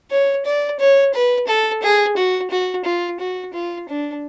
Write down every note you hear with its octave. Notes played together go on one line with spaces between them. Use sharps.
C#5
D5
C#5
B4
A4
G#4
F#4
F#4
F4
F#4
F4
D4